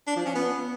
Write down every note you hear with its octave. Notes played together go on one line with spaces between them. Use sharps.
D4
F3
C#4
B3